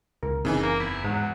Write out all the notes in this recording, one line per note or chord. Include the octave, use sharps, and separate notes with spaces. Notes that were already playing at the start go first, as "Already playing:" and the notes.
C#2 A#4
F#1 C#3 E3 C4 D#4 G#5
A#3 A#4
E2 E4
G#2 F#3